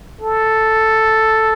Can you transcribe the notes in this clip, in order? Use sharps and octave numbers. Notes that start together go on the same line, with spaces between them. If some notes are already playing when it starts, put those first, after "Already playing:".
A4